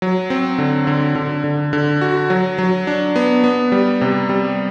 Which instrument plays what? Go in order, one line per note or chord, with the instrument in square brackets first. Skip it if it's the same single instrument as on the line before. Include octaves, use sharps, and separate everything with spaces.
[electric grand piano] F#3
C4
D3
D3
D3
D3
D3
F#4
F#3
F#3
D4
B3
B3
G3
C3
G3